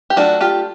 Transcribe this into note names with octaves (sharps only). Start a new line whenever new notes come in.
G4
F#3 A3 D4 F4 F#4
F4 G4